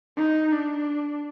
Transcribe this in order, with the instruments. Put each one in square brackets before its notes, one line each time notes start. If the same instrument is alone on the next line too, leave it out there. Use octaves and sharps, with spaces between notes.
[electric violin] D#4
D4